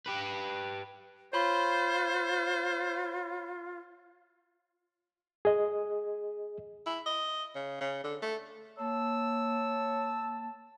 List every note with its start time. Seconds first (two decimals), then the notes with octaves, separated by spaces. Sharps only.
0.07 G4 B4
1.33 F4 C5 C#5 B5 C6
5.45 G#4 D#5
6.86 E4
7.06 D#5
7.55 C#3
7.81 C#3
8.04 D3
8.22 A3
8.79 A#3 C#5 A5 E6